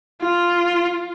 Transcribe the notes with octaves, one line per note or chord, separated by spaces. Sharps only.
F4